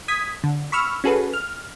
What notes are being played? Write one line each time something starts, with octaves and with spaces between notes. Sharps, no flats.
D#6 G#6 B6
D3
B5 C#6 E6 F6
C#4 F#4 G#4 A4 B4
F6